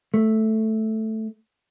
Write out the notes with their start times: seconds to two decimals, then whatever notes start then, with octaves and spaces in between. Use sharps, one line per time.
0.14 A3